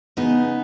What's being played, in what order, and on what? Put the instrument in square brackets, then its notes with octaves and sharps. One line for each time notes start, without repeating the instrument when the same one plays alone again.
[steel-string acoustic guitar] C#3 B3 D#4 G#4